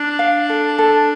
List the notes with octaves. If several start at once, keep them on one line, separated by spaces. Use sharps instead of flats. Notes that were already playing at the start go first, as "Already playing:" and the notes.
Already playing: D4
F5
A4
A4